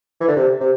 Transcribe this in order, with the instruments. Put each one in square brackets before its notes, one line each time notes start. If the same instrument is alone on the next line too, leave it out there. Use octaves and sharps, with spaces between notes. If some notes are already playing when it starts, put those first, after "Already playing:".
[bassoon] E3
D3
C3
C3